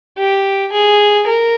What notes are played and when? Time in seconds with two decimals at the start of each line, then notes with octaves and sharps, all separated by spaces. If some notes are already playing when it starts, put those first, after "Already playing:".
0.18 G4
0.72 G#4
1.27 A#4